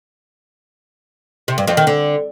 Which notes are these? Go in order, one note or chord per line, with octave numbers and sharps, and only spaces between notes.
C3
G2
F2
D#3
D3